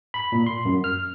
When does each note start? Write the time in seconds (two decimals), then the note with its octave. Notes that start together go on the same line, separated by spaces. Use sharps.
0.14 B5
0.32 A#2
0.46 C6
0.65 F#2
0.84 F6